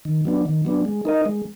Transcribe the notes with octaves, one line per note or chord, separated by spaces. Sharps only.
D#3
F#3 B3 D4
D#3
F#3 B3 D4
G#3
D#4 A#4 D#5
G#3